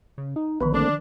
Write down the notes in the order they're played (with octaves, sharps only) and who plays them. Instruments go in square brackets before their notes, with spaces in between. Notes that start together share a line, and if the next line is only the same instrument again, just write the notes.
[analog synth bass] C#3
D#4
[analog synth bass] A#1 [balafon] D3 D#3 F3 [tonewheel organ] B3 B4
[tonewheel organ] A3 A#3 C4 [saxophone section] D4